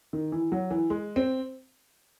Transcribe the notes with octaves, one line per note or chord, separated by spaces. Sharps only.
D#3
E3
F#3
E3
G#3
C4